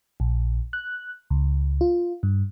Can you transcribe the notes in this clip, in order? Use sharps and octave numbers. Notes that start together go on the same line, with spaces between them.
A#1
F#6
C#2
F4
G2